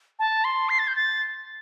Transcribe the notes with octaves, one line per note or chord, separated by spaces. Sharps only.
A5
C6
C7
A6
G6
A6